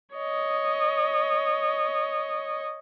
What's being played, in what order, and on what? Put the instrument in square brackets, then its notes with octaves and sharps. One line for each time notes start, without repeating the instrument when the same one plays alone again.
[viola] C#5 D#5